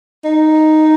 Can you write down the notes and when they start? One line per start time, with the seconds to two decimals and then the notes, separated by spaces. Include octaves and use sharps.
0.24 D#4